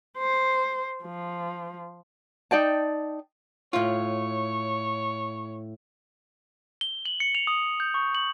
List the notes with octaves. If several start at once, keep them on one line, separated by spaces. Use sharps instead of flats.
C5
F3
D#4 D5 G5 A5
A2 F4 C#5
G7
F#7
C#7
F7
D#6
G6
C#6
F#7